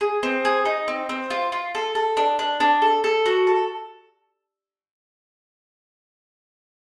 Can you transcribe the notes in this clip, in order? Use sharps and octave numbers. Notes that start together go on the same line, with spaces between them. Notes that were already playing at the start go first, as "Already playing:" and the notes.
G#4
C4
G#4
D#4
C4
C4
F4
F4
A4
A4
D4
D4
D4
A4
A4
F#4
A4